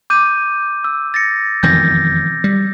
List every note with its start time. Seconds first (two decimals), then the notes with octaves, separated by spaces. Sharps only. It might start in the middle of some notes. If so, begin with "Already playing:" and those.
0.10 D6 G6 D#7
0.84 E6
1.14 A6 A#6 C#7
1.63 E1 F2 D#3 G6 A#6
2.44 G3